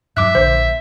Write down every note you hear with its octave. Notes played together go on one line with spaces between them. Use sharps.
G2 F#3 E5 D6 F#6
A#1 D3 C5